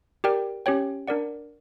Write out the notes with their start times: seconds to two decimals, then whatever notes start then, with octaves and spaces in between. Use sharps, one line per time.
0.24 G4 A#4 D5 G5
0.66 C#4 G4 C#5 G5
1.08 D4 A#4 D5 F#5